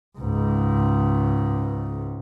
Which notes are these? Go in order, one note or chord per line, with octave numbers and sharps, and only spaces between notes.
C#2 G#2